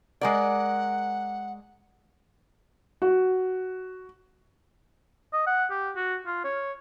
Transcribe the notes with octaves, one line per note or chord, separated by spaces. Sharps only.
G#3 A#4 D5 F#5
F#4
D#5
F#5
G4
F#4
F4
C#5